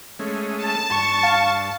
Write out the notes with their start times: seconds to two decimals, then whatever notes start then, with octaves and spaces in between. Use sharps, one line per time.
0.19 G#3 A3 C#4
0.58 A5
0.91 G2 C#6
1.23 F5